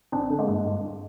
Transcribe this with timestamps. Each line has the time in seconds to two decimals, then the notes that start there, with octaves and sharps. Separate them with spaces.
0.12 G#1 C4 D4
0.30 D3
0.39 G#3 A#3
0.49 G2
0.66 G2